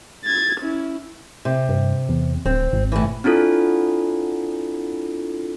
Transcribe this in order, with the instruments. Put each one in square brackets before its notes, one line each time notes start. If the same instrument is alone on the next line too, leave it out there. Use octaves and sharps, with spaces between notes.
[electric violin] G#6 A6
C#4 E4
[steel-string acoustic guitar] C3
[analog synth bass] G2
E2
[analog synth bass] D1 [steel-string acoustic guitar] C4
[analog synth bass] G#1
[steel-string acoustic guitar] A2 E3
[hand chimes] C4 D4 E4 F4 A4